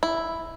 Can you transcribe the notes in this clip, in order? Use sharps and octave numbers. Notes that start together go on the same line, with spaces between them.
E4